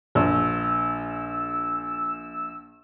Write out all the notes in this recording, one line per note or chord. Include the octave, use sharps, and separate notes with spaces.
A#1 E6